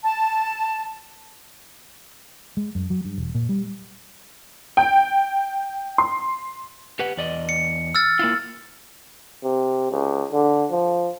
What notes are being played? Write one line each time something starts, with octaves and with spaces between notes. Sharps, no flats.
A5
G#3
F#2
F#3
G2
E1
A#2
G3
G5
C6
G4 B4 F#5
E2 D5 D#5
C#7
E6 F6 A6
A#3 E4 F4
C3
C#2
D3
F3